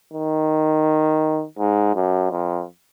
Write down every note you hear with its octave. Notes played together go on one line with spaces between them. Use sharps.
D#3
G#2
F#2
F2